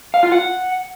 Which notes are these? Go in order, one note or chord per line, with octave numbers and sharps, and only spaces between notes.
F5
F4
F#5